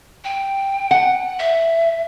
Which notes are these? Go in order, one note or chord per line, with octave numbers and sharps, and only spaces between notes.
G5
F#5
E5